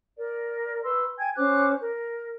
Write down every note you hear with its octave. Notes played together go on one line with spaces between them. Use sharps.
A#4 D5
B4 C6 E6
G5 G#5 G#6
C#4 C5 D6 F#6
A#4